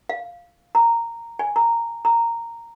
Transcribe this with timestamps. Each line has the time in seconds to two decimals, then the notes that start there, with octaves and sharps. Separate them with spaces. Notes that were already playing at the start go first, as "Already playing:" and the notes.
0.09 F5
0.75 A#5
1.39 G#5
1.56 A#5
2.05 A#5